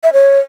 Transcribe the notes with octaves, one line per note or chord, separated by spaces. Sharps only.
E5
C#5